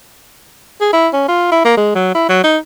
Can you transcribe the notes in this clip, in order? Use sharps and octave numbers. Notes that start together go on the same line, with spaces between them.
G#4
E4
C#4
F4
E4
A#3
G#3
F#3
E4
F#3
D#4